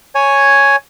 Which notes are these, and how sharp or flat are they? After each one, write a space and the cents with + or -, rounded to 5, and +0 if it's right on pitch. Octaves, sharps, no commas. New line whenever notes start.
C#5 +0 G#5 +0